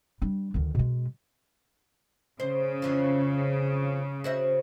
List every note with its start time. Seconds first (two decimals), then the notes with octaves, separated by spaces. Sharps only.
0.22 G3 D4
0.54 D2 D#3
0.75 B2 G#3
2.40 C#3 C5
2.82 F2 E3 F3
4.24 F#4 C5 E5